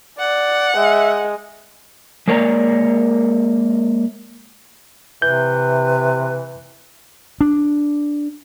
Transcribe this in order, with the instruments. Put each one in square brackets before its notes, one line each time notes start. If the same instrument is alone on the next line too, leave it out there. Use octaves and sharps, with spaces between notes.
[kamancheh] D5 [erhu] F#5
[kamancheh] G#3 [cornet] E5
[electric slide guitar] G#3 A#3 A#4 C#5 D5 A#5
[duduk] C3 [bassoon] E3 [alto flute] B4 [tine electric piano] G6
[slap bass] D4